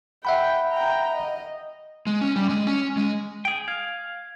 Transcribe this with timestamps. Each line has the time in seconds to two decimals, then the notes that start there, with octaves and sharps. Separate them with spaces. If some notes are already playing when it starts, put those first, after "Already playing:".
0.25 E5 F#5 G5 B5
0.71 G5 A#5
1.14 D#5
2.07 G#3
2.21 C#4
2.36 G3
2.50 G#3
2.67 C#4
2.97 G#3
3.45 G#4 G5
3.68 F5 G#6